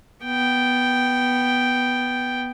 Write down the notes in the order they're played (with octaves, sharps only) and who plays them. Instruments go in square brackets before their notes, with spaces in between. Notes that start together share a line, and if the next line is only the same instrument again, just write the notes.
[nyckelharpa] B3 G5